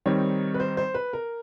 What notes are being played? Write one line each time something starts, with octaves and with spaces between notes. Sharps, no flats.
D#3 G3 C4 D#4 C#5
B4
C5
C5
B4
A#4